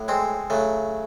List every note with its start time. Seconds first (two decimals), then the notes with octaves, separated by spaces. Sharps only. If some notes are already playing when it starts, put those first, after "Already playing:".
Already playing: A2 F#3
0.08 G#3 C4
0.50 C#3 F#3 A3